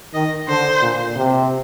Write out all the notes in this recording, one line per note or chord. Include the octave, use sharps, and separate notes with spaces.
D#3 D#5
D3 C5
A#2
C3